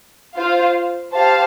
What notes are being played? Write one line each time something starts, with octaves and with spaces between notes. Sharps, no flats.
F4 C5 F5
G4 C5 F5 A5